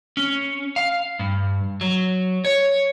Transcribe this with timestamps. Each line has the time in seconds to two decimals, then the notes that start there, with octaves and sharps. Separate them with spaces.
0.17 C#4
0.76 F5
1.19 G2
1.81 F#3
2.45 C#5